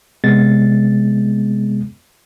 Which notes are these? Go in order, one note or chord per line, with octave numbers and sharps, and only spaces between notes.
C3 G#3 B3 A6